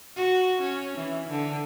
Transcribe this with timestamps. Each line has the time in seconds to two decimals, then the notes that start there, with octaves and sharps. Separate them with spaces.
0.16 F#4
0.61 C#4
0.98 E3
1.29 D3